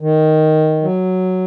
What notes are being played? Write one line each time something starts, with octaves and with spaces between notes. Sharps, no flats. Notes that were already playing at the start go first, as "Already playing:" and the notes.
D#3
F#3